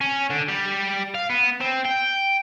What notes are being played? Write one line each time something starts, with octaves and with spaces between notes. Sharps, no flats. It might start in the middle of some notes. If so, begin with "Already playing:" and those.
C#4
D3
G3
F5
B3
C4
G5